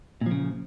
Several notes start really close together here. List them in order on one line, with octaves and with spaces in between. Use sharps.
A#2 F3 C#3